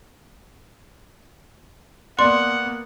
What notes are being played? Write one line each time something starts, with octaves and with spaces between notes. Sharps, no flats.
A#3 B3 D5 F#5 C6